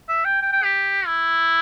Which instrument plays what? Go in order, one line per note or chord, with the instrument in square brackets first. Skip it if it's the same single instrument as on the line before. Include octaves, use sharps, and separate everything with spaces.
[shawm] E5
G5
G5
G5
G4
E4